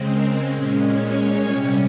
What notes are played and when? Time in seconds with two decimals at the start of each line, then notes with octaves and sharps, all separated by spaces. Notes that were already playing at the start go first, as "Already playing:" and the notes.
Already playing: C#3 G#3 C4
0.09 A#4
0.51 A#2 G#3 C#4 C#5
0.94 C#5
1.37 C3 G3 C#4